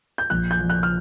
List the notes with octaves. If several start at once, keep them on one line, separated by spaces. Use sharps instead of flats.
G6
A#1 F#6
G6
F3
F#6
F6